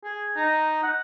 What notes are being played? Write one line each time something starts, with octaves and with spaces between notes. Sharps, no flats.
G#4
D#4
F#5